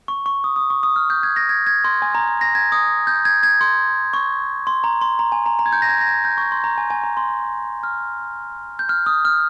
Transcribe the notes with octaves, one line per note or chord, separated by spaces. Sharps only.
C#6
C#6
D#6
D#6
C#6
D#6
F6
G6
G#6
A#6
G#6
G#6
C6
G#5
A#5
A#6
G#6
D#6
G6
G#6
G#6
C6
C#6
C6
A#5
C6
A#5
G#5
A#5
A#5
G#6
G6
A#6
G#6
A#6
G#6
G6
C#6
C6
A#5
G#5
G#5
A#5
C6
F6
G6
F6
D#6
F6